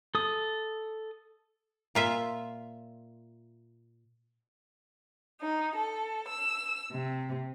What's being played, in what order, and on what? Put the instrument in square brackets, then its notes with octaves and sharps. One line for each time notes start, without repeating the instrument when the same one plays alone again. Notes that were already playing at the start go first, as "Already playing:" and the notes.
[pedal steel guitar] A4 D#6
[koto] A#2 F4 E5
[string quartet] D#4
A4
E6
C3